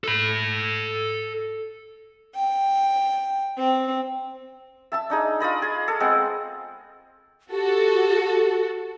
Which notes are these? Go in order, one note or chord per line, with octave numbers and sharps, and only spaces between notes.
A4 B5
G5
C4
E5 A5 E6
D4 D#4 G#4
F4 D5 D#5 B5
G#4
A4
G#3 B3 C4
F#4 G4 A4